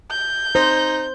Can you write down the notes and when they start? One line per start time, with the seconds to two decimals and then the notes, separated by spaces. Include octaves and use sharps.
0.11 G6
0.55 D#4 C5